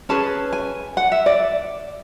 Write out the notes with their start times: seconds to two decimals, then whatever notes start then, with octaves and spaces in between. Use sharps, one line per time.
0.09 C#4 G#4 B4 A5
0.53 G#5
0.97 F#5
1.12 E5
1.26 D5